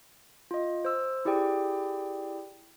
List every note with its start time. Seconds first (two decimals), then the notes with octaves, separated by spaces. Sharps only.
0.51 F4 D#5
0.85 C5 E6
1.25 E4 G4 G#4 D5 G5